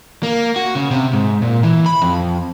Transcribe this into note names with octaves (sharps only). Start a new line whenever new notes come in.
A#3
F#4
C#3
C3
G#2
A#2
E3
B5
F2